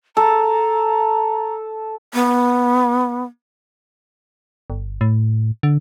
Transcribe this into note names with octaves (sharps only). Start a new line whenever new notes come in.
A4 A#5
B3
G1
A2
D3